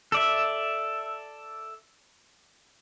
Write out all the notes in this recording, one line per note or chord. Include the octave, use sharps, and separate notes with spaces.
A4 D5 E5